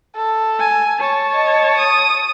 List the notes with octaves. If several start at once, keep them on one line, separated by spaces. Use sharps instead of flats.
A4
G#5
C#5 A5
D#5
D#6